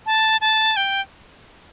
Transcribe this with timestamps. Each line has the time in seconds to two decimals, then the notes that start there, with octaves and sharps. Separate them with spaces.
0.06 A5
0.41 A5
0.77 G5